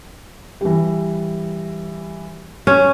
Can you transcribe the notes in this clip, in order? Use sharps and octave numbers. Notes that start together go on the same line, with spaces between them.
E3 G3
C#4